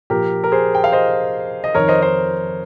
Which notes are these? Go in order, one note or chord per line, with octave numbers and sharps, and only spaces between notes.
A#2 F3 G4 A#4
A#4
G#4 C5
G5
F5
C5 D#5
D#5
F2 D#3 A#4 C#5
C5 D#5
C5 D#5